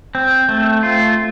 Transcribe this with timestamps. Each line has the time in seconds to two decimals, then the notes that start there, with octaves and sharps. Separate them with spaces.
0.15 C4
0.49 A3
0.83 F4